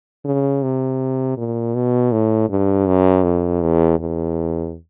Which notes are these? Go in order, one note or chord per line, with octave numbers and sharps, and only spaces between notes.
C#3
C3
A#2
B2
A2
G2
F#2
F2
E2
E2